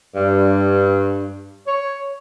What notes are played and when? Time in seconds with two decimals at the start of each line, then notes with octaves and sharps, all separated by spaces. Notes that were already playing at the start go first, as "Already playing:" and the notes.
0.15 G2
1.66 C#5